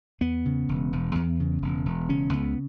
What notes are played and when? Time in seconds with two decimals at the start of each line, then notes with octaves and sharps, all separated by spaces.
0.21 E2 B3
0.45 C#3
0.69 E1
0.93 E1
1.15 E2
1.40 C#3
1.62 E1
1.86 E1
2.09 C#3 C#4
2.33 C#2 B3